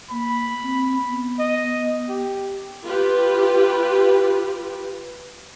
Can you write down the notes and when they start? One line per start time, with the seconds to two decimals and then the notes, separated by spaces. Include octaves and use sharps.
0.10 A#3 B5
0.63 C4
1.06 B3
1.39 D#5
2.09 G4
2.85 F4 G4 B4